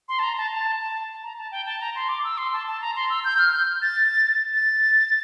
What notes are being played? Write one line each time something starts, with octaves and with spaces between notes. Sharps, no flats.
C6
A5
A#5
A5
A5
A5
A#5
A5
G5
A5
A#5
C6
D6
E6
C6
A5
A5
A#5
C6
E6
G6
F6
G6
A6
A6